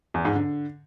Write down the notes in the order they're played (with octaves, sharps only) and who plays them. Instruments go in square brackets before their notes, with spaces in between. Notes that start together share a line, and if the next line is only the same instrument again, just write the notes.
[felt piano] E2
G#2
D3